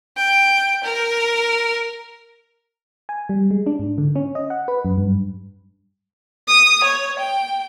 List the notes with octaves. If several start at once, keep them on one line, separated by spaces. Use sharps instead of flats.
G5
A#4
G#5
G3
G#3
D4
G#2
D3
C#4
D#5
F#5
B4
F#2
G2
D#6
C#5
G5